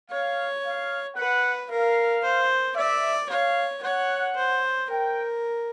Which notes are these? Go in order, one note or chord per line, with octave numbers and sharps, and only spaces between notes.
C#5 F5
F5
B4 F#5
A#4 F5
C5
D5 E5
C#5 F5
C#5 F#5
C5
A#4 G5